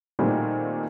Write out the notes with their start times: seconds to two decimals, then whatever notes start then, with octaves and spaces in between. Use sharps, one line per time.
0.19 A#2 D#3 G3 A3 C4 F#4